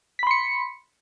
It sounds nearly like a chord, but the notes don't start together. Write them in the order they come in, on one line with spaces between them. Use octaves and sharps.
B6 B5 C6 C#7